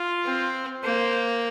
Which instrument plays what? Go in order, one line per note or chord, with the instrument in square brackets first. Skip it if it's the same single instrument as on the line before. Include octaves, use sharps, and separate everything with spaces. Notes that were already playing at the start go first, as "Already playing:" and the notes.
Already playing: [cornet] F4
[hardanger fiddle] C4
[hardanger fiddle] A#3 [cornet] C5